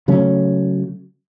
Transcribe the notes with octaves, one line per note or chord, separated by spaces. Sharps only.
C#3 F#3 A3 C#4